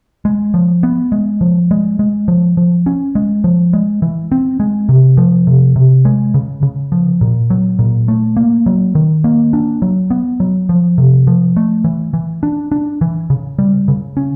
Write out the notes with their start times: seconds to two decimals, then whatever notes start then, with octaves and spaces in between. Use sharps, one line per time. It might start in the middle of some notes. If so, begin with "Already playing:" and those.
0.25 G#3
0.54 F3
0.83 B3
1.12 G#3
1.41 F3
1.71 G#3
1.99 G#3
2.28 F3
2.57 F3
2.86 C#4
3.15 G#3
3.44 F3
3.73 G#3
4.02 E3
4.32 C4
4.60 G#3
4.89 C3
5.17 F3
5.47 C3
5.76 C3
6.05 G#3
6.34 C#3
6.63 C#3
6.92 F3
7.21 A#2
7.50 F#3
7.79 A#2
8.08 A3
8.36 A#3
8.66 F#3
8.95 D#3
9.24 A#3
9.53 D4
9.82 F#3
10.11 B3
10.40 F#3
10.69 F3
10.98 C3
11.27 F3
11.56 A3
11.84 E3
12.14 E3
12.43 D4
12.72 D4
13.01 E3
13.30 C#3
13.59 G3
13.88 C#3
14.17 C#4